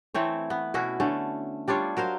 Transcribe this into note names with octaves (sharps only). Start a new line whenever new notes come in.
E3 A3 C4 C#5
B3
B2 C#4 E4 F#4
D3 A3 C#4
G3 D4 F4 C#5
F#3 A#4 C5 F5